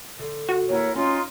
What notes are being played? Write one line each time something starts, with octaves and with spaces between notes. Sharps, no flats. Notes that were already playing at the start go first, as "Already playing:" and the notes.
D3
F#4
D#2 E4 A#4 C#5 F#5
C#4 D#4 F4 C6